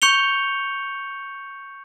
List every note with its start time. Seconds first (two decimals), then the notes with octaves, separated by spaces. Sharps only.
0.02 C#6 G6 C#7 F7 G7